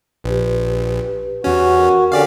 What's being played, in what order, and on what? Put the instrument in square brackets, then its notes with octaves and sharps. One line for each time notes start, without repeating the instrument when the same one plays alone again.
[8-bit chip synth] A#1 [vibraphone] G4 B4
[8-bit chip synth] E2 C#4 [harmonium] F#4
[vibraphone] A#4
[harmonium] D3 C#4 [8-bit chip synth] G4 D5 F5